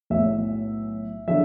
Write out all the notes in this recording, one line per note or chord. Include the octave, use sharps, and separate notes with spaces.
B1 A2 F#3 E5
D3 F#3 E5